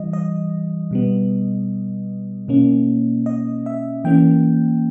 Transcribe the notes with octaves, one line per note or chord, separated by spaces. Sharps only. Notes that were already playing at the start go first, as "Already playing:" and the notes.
Already playing: E3 G3 D#5
D#5
B2 G3 B3
B2 A#3 C#4
D#5
E5
E3 A#3 C#4 G5